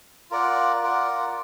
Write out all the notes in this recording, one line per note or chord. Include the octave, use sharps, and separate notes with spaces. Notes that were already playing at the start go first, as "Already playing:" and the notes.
F4 A#4 D5 F#5
F4 A#4 D5 F#5